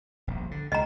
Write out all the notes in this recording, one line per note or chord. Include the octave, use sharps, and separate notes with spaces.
D#1 A#1
D3
C#2 D#3 D#5 A#5